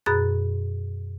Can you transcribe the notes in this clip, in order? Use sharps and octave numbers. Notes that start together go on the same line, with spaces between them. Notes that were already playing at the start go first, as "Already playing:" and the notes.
F#2 B2 G#4 B5 F#6 A6